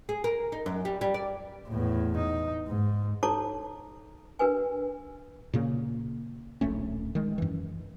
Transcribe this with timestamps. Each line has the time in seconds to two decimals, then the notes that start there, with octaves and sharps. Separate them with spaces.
0.09 G#4
0.24 A#4
0.52 D#4
0.66 F#2
0.85 G3
1.01 G3
1.14 D5
1.69 E2 A2
2.17 D#4
2.67 G#2
3.23 D#4 A4 C#5 A5 A#5 D6
4.39 D4 A#4 B4 G#5
5.53 A#2 C#3 A#3
6.61 D1 A#1 A3 C#4
7.15 D#3 G#3
7.38 F#2 E3